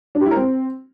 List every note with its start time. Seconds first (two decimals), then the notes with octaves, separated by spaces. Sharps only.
0.15 D4
0.20 G4
0.26 E4
0.31 A#4
0.36 C4